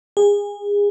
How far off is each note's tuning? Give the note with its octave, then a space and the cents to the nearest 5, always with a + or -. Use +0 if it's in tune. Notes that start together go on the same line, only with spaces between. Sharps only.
G#4 -30